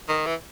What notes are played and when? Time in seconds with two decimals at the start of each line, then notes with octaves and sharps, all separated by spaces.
0.08 D#3
0.26 E3